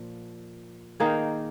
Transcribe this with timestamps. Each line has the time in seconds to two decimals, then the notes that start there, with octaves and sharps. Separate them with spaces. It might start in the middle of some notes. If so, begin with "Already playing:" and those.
Already playing: A#2 F3
1.00 D#3 A#3 D#4 G#4